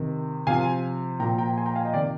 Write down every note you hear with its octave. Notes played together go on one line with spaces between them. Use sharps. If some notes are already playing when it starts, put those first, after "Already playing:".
Already playing: C3 D#3
C3 F3 F5 G#5
A#2 F3 G5 A#5
G5 A#5
G#5 C6
G5 A#5
F5 G#5
D#5 G5
C3 D#3 D5 F5